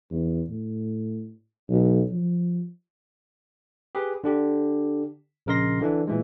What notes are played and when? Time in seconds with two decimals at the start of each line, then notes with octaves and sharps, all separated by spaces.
0.11 E2
0.50 A2
1.69 B1
2.11 F3
3.95 G4 G#4 B4
4.24 D3 D4 G4
5.46 A#1 C#3 A#4 D#5 C6 A#6
5.80 D3 E3 D4
6.07 A#2 E3 G#3